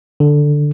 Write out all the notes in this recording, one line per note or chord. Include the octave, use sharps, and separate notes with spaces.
D3